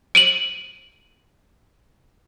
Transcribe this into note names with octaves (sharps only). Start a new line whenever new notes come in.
D7 D#7 F#7